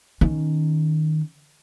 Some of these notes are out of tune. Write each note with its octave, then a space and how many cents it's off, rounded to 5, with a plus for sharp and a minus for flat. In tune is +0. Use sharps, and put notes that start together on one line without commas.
D#3 +0 C#4 +0